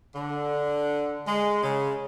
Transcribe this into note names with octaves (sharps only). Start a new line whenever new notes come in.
D3
G#3
C#3